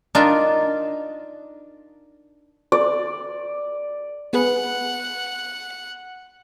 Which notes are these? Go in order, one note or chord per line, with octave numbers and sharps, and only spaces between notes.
D4 D#4 F4 A#4 D5
D5
B3 G#4 B4 F#5